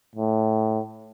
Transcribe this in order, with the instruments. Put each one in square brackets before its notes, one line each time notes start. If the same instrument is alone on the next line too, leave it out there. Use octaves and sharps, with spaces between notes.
[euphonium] A2